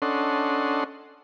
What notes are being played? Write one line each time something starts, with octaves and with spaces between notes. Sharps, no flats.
C#4 D4 A4 D#5 F#5 C6